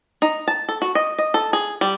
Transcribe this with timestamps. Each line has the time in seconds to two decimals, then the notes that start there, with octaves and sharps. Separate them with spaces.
0.22 D#4
0.48 A5
0.69 A4
0.82 F#4
0.95 D#5
1.18 D#5
1.34 A4
1.53 G#4
1.81 G3